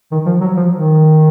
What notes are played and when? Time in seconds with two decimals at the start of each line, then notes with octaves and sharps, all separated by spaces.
0.12 D#3
0.26 F3
0.41 F#3
0.57 F3
0.72 D#3